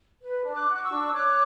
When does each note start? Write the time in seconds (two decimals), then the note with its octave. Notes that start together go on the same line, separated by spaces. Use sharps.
0.22 B4
0.45 D4
0.53 D6 F#6
0.68 F#4
0.76 D6
0.83 C#6 E6
0.91 D4
1.07 E6
1.14 C#5 D6 F#6